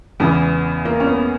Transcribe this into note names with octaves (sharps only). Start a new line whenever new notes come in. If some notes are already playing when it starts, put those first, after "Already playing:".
E2 C#3 E3 B3
A#3
C#4
B3